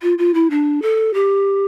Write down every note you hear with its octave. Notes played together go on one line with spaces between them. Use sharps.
F4
F4
E4
D4
A4
G4